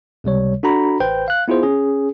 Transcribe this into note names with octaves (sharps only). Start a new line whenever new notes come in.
C#2 C3 G3 C#5
D4 F#4 A4 A#5 B5
A1 B4 C5 G5 G6
F5 F#6
B3 E4 F4 G#4 C5
C#4 G#4